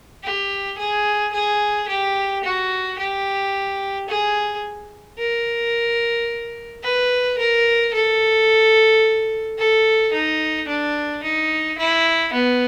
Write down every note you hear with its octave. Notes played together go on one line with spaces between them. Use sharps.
G4
G#4
G#4
G4
F#4
G4
G#4
A#4
B4
A#4
A4
A4
D#4
D4
D#4
E4
B3